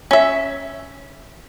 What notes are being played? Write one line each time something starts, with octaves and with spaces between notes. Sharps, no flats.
C#4 E5